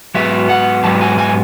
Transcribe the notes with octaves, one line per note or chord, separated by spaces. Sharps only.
G#2 F#3 B3 E5
F#5
G#2 F#3 B3 A5
G#5
G#5